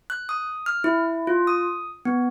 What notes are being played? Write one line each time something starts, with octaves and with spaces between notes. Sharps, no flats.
F#6
D#6
F6
E4
F4
D#6
B3